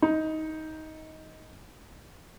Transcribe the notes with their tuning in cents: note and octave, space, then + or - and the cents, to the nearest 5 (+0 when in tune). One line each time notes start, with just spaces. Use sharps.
D#4 +15